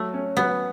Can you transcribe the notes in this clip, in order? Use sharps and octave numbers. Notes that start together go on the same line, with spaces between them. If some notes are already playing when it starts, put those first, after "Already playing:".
Already playing: F#3 A3
C#4
F#3 B3